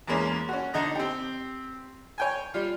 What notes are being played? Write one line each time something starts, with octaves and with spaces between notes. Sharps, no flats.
E2 G#3 A#3 C#4
C#4 F#4
D3 D#4 D#5 A#5
C4 G4
C#5 G5 G#5
G3 F4